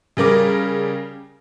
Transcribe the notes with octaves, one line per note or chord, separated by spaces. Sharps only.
C#3 G3 A#4 D6